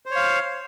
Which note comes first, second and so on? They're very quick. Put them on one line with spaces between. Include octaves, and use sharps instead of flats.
C5 C#5 F5